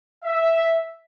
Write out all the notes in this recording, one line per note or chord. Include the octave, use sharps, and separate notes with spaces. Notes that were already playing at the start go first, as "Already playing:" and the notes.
E5